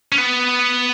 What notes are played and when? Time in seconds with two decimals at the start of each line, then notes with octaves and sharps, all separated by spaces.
0.12 C#4
0.18 B3